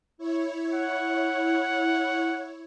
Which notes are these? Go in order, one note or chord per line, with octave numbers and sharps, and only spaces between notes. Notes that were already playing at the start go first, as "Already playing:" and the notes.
E4 C#5
F#5